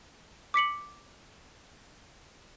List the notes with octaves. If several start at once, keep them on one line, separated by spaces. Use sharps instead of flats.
D6 B6 C#7 F#7